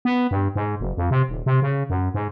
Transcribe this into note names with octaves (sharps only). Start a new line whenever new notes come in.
B3
G2
G#2
F#1
F2
C3
D#1
C3
C#3
F#2
G#2